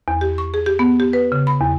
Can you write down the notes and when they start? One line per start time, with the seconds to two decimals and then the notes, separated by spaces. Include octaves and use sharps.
0.08 E2
0.21 G4
0.38 C#6
0.54 G#4
0.66 G4
0.79 B3
1.00 G4
1.13 B4
1.32 C#3
1.47 B5
1.61 E2